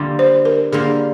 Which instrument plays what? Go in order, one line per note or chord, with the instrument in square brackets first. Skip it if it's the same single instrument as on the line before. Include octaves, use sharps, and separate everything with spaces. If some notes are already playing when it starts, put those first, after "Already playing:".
Already playing: [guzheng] D3 G3 A#3 F4
[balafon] C5
A#4
[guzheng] D3 G3 A#3 F4 [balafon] G#4